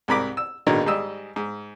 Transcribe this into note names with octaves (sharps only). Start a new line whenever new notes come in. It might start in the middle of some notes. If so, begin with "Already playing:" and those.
C2 G#2 A#4 B5 D6
E6
A#1 B2 D3 D#3 D#4
G#2 G3 D#5 E6
G#2